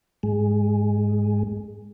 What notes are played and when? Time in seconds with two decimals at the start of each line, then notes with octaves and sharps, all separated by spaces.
0.23 G#2 G#3